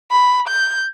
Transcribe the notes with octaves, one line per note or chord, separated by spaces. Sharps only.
B5
G6